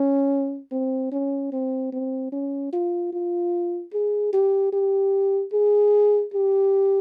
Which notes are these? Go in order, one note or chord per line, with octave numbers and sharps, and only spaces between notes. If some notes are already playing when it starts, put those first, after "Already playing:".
Already playing: C#4
C4
C#4
C4
C4
C#4
F4
F4
G#4
G4
G4
G#4
G4